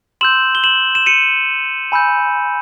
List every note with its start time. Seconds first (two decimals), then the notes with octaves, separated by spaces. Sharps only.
0.21 C6 E6 G6 E7 F#7
0.55 G7
0.64 E7 F#7
0.95 E7
1.06 C#7 D#7
1.92 G#5 B5 E6 G6